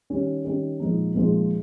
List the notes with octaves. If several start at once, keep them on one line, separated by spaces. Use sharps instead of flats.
D#3 G3 C#4
D#3 G3 C#4
A#2 F3 G#3 D#4
A#2 F3 G#3 D#4